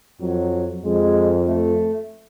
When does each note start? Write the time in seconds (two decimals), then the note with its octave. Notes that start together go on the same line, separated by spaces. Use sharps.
0.21 F2 F#3
0.84 F2 G#3
1.48 A3